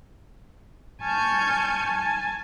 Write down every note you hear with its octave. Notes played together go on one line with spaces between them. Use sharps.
G#5 A5 C#6 F6 G6 G#6
G#5 A5